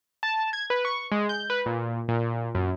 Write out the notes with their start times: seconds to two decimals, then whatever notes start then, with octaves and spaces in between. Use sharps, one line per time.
0.23 A5
0.53 G#6
0.70 B4
0.85 C#6
1.12 G#3
1.29 G6
1.50 B4
1.66 A#2
2.08 A#2
2.55 F#2